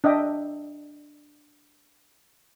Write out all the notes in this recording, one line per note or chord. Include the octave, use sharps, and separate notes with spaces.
D4 D#5 E5 G5 D#6